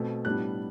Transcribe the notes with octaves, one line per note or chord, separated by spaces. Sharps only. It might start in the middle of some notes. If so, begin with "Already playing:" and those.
Already playing: B2 A3 C4
A2 G3 B3 D4 F#6